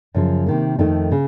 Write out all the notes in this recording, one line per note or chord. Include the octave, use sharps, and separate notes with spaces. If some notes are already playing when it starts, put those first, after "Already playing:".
F#2 C#3 F3
C3 D#3 A#3
F2 D#3 A3 D#4
C#3